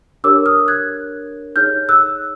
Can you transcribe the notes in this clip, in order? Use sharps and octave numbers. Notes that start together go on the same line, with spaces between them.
D4 G4 A#4 C#5 D6 E6
D#6 F6
F#6 G#6
D#4 G#4 C#5 F6 G6
E6 F#6